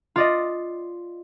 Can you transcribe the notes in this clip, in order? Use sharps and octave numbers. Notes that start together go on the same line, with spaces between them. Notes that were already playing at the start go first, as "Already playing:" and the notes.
F4 D5 D#5